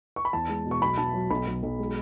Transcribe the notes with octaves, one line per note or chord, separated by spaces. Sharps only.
C#6
B5
E2 A5
G#3
B2
C#6
B1 B5
B1 A5
F#3
B1 B5
B1
B1
G#3